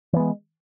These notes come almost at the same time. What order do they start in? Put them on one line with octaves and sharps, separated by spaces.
E3 B3 G#3